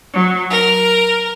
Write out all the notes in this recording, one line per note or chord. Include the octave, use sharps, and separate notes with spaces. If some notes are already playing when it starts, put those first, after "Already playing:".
F#3
A#4